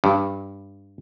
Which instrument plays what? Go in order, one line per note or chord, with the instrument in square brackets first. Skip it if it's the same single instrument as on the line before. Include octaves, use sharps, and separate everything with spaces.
[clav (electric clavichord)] G2